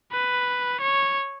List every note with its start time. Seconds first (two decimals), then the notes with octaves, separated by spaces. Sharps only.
0.12 B4
0.81 C#5